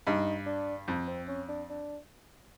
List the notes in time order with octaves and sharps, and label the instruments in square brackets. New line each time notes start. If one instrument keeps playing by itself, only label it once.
[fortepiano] G2 [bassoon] D#4
[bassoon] D4
[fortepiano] F2
[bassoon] C4
C#4
D4
D4